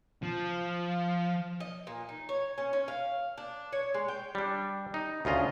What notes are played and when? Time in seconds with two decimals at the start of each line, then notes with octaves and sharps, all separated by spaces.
0.23 F3
1.60 D#5
1.87 A#2
2.09 D#4
2.29 C#5
2.58 C#4
2.73 C#4
2.88 F5
3.38 D4
3.73 C#5
3.94 G#3
4.08 G5
4.35 G3 D4
4.94 D#4
5.25 D2 C#3 F4 D#5 A#5